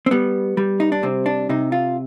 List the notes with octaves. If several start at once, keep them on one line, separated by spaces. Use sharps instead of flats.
C4
G3 B3
G3
D#4
D4
C3 C4
D4
C3 D#4
F4